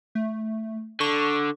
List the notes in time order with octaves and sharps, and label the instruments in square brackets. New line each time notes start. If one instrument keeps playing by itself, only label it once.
[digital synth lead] A3
[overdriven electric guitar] D3 [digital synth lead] C#6